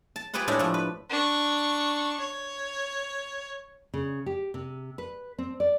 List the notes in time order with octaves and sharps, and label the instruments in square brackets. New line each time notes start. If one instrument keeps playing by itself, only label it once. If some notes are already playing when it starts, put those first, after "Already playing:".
[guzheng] A5
F4 G4 G#4 B4 C5 F#5
A2 G3 G#3 D4 E4
F3 A3
B4
[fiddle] D4 C#6
C#5
[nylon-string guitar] C#3
G4
C3
B4
C4
D5